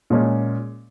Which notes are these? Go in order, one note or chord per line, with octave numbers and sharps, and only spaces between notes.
A#2 G#3 C#4